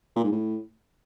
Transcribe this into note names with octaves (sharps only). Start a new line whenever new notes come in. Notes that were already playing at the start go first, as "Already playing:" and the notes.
A#2
G#2
A2